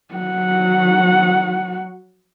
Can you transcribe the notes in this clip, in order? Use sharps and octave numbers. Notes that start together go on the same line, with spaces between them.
F#3 F#5